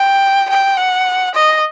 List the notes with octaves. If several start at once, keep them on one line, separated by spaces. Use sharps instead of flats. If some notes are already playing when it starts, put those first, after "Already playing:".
Already playing: G5
G5
F#5
D#5